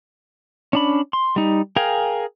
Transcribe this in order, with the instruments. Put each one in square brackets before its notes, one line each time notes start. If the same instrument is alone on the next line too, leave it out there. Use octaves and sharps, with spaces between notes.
[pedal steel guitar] C#4 D4 B5
C6
G3 D#4
G#4 A#4 F5 G5 G#5